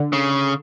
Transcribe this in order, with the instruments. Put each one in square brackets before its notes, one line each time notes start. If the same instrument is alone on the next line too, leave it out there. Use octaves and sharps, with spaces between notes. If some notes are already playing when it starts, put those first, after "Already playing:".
Already playing: [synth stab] D3
[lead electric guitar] C#3